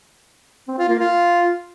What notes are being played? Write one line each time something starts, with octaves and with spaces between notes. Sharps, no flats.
C4
F4
A#3
F4